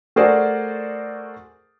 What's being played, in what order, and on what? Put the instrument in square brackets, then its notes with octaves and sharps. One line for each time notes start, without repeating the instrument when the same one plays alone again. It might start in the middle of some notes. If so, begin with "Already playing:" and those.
[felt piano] A3 F#4 G#4 A#4 C5 D5